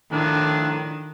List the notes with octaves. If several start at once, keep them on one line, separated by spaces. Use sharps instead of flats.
A2 D#3 F3 D4